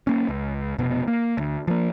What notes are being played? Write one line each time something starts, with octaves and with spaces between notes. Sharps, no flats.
A#3 C#4
C#2
F1 B2 B3
A#3
D2
F3 A#3